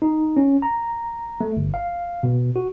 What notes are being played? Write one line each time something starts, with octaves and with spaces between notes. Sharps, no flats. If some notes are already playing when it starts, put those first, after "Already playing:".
D#4
C#4
A#5
A3
G1
F5
B2
F#4